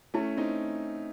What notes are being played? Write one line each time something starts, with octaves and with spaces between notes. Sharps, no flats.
A3 C#4 E4
C4 D#4